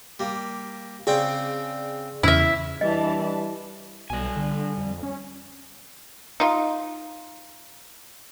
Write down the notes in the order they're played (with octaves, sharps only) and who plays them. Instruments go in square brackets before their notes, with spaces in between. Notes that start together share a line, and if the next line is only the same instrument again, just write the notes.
[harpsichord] G3 A#3
[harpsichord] C#3 C4 G5 [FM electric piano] G#4 D5
[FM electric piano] E2 C#3 F6 [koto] E4 E5
[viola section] E3 D4 A5 [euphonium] G3 [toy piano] D#5
[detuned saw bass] B1 [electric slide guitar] G3 G#5
[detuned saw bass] D3
F2
C#4
[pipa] D#4 F4